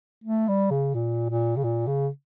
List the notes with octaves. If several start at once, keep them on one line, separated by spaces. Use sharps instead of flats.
A3
G3
C#3
A#2
A#2
C#3
A#2
C#3